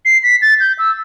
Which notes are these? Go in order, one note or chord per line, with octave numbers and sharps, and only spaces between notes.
C7
B6
A6
G6
E6